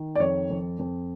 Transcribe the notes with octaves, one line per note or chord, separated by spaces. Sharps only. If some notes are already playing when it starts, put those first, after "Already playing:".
Already playing: D#3
D5
F2 C#5
F2
F2